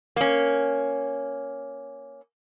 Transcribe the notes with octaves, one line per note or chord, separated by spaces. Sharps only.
A#3 C#4